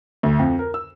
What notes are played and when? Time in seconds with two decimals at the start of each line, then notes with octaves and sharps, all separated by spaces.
0.23 D2
0.39 F2
0.59 A#4
0.74 E6